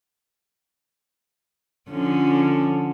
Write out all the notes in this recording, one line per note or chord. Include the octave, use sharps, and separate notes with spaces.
D3 F3 C#4